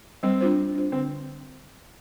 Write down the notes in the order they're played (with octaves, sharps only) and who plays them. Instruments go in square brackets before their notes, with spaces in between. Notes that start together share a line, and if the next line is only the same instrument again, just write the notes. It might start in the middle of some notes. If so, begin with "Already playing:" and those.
[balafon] G3 [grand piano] C4
[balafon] D4 F4 C5
G3
D4 F4 C5
[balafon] D3 [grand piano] C4